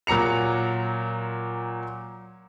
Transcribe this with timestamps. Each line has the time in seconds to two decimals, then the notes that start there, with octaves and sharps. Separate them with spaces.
0.07 A#2 F#3 A#5 C#7 F7